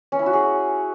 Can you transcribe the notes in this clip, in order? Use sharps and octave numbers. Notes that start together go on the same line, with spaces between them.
C#4
E4
F#4
G#4